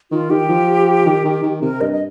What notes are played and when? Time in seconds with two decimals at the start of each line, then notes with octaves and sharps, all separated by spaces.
0.11 D#3 F4
0.30 D#3 G4
0.49 F3
1.06 D#3
1.25 D#3
1.42 D#3
1.61 C3 A#4
1.81 G2 D#5
1.93 D#5